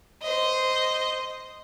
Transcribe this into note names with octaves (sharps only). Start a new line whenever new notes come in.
C5 D#5